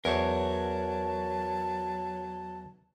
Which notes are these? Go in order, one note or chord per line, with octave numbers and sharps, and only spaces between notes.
E2 F#3 A#4 C5 C#5 A5